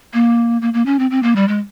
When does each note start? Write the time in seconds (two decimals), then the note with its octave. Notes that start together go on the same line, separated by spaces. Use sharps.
0.14 A#3
0.62 A#3
0.74 A#3
0.86 C#4
0.99 C4
1.11 C4
1.23 A#3
1.36 G3
1.48 G#3